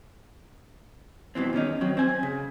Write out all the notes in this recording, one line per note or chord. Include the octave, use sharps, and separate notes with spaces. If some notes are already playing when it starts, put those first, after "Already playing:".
G2 B2 E3 C4
E2 D#3 C#4 D#4
D#3 F#3 C4
C4 C5 G#5
C#3